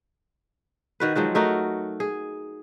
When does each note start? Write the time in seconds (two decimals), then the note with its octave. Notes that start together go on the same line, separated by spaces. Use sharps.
1.00 D#3 F#4 B4
1.16 F3 F#3 G#3 F#4
1.35 A3 D#4 F#4 A#4
2.00 G#4